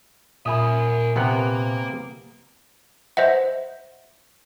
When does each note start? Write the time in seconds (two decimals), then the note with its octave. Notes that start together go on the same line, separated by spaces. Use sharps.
0.46 A#2 A#4 E5 G#5 B5 D#6
1.16 C3 A#3 B3 F#5 A#5
3.17 C5 D#5 E5 F#5